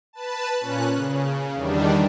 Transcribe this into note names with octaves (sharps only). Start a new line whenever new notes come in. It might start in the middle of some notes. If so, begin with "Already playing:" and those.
B4 A5
A#2 C#4 F#6
C#3
E2 D#3 G3 D4